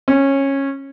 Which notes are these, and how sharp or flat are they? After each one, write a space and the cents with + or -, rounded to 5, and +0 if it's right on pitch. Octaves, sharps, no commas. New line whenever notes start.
C#4 -15